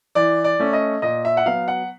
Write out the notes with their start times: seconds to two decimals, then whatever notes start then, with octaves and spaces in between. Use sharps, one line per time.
0.15 E3 D5
0.44 D5
0.59 A3 C#4
0.73 D#5
1.02 A#2 D#5
1.25 E5
1.37 F#5
1.46 F#3 B3 F5
1.68 F#5